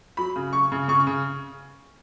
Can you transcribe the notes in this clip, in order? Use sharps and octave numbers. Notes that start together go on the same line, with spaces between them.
F#3 B5
C#3
C#3 C#6
C#3
C#3 C#6
C#3